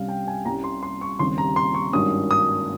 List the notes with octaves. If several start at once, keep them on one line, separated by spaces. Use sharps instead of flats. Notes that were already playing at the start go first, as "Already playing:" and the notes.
Already playing: C2 C3 G3 C#4 F5
G5
G#5
C2 C3 G3 C#4 A#5
C6
C6
C#6
D#2 C#3 G3 C4 C6
A#5
C6
C#6
G#1 G2 D#3 A#3 C#4 D#6
D#6